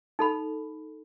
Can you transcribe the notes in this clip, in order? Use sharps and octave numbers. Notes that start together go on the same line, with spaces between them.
D#4 A4 B5